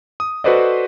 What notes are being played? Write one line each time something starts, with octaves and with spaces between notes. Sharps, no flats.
D#6
F#4 A4 B4 C5 D5 D#5